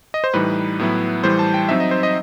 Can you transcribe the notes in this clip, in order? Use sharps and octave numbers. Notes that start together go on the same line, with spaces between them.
D#5
C5
A2 E3 G3 D#4 B4
A2 F#3 B3 E4
A2 E3 G3 C5
A5
G5
F#3 C4 D#4 E5
D#5
C5
D#5